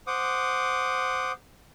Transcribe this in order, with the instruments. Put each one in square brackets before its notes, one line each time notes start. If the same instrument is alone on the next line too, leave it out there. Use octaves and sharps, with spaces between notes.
[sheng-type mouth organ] C5 F#5 D6 D#6